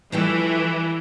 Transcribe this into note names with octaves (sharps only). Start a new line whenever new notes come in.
E3 F3 G3 A3